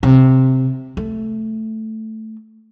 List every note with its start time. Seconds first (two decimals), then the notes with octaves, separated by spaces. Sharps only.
0.03 C3
0.97 A3